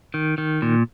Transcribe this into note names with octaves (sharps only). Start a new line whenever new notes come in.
D#3
D#3
A#2